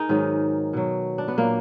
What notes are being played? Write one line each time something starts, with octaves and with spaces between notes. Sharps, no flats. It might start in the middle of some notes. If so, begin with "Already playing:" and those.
Already playing: D#4 G#4 A#4
G#2 D#3 F#3
B2 F#3
D4
B3
A#2 F#3 A#3